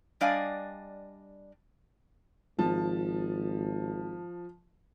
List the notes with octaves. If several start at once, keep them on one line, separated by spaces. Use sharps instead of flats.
G3 D4 D5 D#5 F5 G#5
G#1 F3 A5